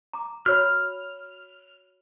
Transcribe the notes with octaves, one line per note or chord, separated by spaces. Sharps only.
A#5 D6
F#4 C#5 B5 F6